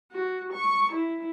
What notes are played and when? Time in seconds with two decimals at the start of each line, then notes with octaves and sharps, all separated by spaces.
0.12 F#4
0.53 C#6
0.92 E4